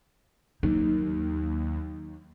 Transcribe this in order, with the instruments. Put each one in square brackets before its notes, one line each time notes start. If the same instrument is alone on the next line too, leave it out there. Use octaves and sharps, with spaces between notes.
[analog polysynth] D#2 [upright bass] F#3 D#4